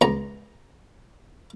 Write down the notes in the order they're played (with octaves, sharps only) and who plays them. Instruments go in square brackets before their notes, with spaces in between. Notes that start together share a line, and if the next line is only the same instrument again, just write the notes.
[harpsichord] C#2 A#5